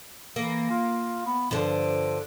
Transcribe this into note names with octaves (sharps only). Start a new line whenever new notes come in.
E3 A#3
F4
B3
G2 D3 F3